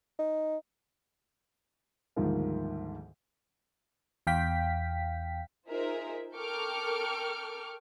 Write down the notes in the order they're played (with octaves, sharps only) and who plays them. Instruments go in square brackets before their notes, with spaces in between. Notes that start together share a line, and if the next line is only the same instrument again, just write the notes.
[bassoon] D#4
[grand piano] D2 G#2 D#3 F3 G3 A#3
[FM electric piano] E2 F5 G5 B6
[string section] D#4 F4 G#4 A#4 C5 E5
A4 A#4 G5 C#6 D6 F6